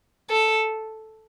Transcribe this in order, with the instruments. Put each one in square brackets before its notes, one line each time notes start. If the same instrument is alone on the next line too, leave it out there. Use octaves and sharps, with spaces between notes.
[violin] A4